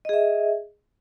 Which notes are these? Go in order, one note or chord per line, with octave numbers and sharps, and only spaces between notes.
G#4 D#5 E5